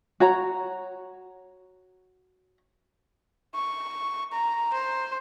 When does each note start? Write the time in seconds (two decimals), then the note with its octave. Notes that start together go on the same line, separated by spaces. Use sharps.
0.20 F#4 C#5 A#5
3.55 C#6
4.32 A#5
4.73 C5